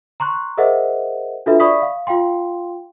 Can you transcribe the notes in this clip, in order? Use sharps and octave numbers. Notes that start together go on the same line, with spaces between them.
A#5 C6 C#6 F#6
G#4 A#4 C5 D#5 E5 F#5
D4 F4 F#4 A4 B4 E5
D5 E5 B5 C#6 D#6 B6
F5
F4 F5 G5 C6